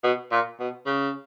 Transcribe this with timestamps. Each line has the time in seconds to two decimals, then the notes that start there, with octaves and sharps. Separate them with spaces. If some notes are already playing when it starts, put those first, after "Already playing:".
0.04 B2
0.32 A#2
0.60 B2
0.86 C#3